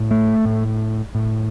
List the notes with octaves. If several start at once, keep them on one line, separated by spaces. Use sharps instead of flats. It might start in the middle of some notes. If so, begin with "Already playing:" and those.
Already playing: A2
A3
A2
A2